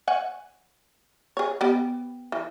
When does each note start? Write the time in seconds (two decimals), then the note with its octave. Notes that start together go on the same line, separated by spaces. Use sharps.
0.08 C#5 F#5 G#5
1.37 G#4 C#5
1.61 B3 G4
2.32 E3